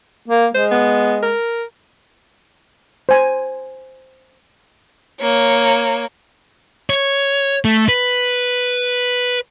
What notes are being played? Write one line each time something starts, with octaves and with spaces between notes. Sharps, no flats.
A#3
G#3 C5
B3
A#4
C5 G#5
A#3 C#5
C#5
A3
B4